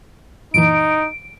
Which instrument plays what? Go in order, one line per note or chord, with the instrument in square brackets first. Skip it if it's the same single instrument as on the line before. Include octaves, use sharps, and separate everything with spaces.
[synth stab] F#2 A#2 E3 [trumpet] D#4 [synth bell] D7